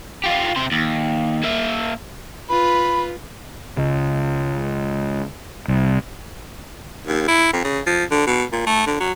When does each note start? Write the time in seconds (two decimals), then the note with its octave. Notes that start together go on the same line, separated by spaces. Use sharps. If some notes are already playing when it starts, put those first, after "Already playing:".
0.24 F4 G4
0.56 C3 C5
0.72 D#2
1.43 A#3 E5
2.49 F4 B4 B5
3.77 C#2
5.68 C2
7.07 D#2
7.28 E4
7.53 F2
7.64 C#3
7.86 F3
8.11 D3
8.27 B2
8.52 A#2
8.67 A3
8.86 D3
9.00 F#3